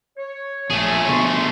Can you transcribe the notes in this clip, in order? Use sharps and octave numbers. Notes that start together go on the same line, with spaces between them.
C#5
A#1 A3 G#4
B2 D3 F3 C6 C#6